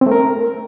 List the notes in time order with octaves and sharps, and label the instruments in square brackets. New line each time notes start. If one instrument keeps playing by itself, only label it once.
[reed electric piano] C4
A3
A#4